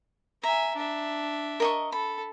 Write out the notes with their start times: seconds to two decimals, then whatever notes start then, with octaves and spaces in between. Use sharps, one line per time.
0.43 E5 G#5 A#5
0.76 D4 E5
1.60 A#4 D#5 C#6
1.92 A4 B5